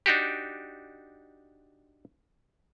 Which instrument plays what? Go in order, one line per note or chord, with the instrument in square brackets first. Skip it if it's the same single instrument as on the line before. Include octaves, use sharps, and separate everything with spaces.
[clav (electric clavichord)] D4 D#4 F#4 G4